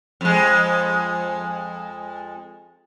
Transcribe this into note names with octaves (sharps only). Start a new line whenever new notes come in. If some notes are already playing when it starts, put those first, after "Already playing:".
F2 G#3